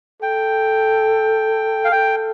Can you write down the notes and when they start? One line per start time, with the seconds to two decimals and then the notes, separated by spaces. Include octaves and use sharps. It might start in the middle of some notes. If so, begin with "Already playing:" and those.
0.22 A4 G5
1.85 F5
1.92 A4 G5